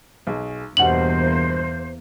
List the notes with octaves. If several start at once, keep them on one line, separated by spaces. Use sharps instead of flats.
B1 G#4
E2 G2 B2 G3 A#3 C5 F#5 F#7